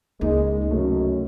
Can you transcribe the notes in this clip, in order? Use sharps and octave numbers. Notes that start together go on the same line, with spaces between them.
C#2 G#3 A#3 D#4
C2 F#2 A3